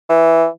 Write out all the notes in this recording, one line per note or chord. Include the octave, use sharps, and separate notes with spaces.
E3